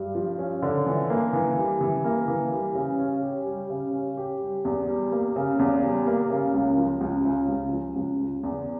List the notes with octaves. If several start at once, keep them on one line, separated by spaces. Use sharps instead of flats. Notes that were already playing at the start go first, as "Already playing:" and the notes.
Already playing: G2
F3
C#4
D3
E3
A#3
E3
G3
E3
A#3
E3
G3
C#3
C#4
G4
G3
C#3
C#4
G4
G3
E2
G3
A#3
C#3
E2
G3
A#3
C#3
C#2
F3
C#2
C#3
C#2
F3
C#2
C#3
E2